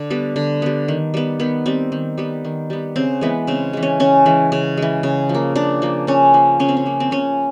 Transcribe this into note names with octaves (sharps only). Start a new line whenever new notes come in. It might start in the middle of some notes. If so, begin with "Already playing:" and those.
Already playing: D3
G3 B3
D3
G3 B3
D#3
G3 B3
D#3 B3
G3 B3 C4
D#3
G3 B3
D#3
G3 B3
C#3 C4
E3 G#3 B3
C#3 C4
E3 G#3
C#4
C#3 C#4
E3 G#3
C#3
E3 G#3
C#3
F3
A#3
C#3 D4
F3 A#3
C#3 C#4
F3 A#3
C#3 C#4
C4
C#4
F3 A#3
C4
C#3 C#4